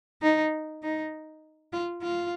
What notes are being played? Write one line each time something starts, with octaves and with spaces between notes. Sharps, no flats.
D#4
D#4
F4
F4